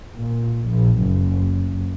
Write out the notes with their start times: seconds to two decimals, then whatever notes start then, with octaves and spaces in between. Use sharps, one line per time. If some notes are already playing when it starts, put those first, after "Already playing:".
0.15 A#2
0.69 A#1
1.00 F#1